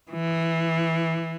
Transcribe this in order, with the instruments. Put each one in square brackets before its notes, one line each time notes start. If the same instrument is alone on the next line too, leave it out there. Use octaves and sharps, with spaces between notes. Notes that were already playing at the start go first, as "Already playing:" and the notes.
[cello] E3